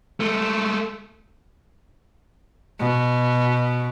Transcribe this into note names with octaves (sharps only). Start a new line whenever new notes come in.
G#3 A3
B2